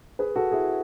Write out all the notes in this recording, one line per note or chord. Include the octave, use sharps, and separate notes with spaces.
G#4 B4
F#4 A4
E4 G#4